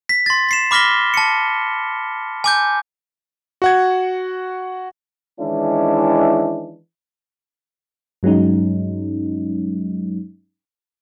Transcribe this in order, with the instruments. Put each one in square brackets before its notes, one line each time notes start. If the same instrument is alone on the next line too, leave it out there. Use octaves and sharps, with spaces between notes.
[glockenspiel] B6
C6 A6
B6 C7 E7
B5 D6 F6 A#6 B6 G7
A5 C#7
G#5 D6 G6
[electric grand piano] F#4 F#5 G#6
[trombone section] D#3 E3 G#3 C#4 D4 E4
[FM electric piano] G2 F#3 G#3 C#4 D#4